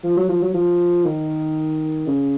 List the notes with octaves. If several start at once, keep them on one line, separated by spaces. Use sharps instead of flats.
F3
F#3
F3
F#3
F3
D#3
C#3